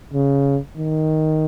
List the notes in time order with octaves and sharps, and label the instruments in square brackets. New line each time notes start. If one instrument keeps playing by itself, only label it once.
[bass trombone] C#3
D#3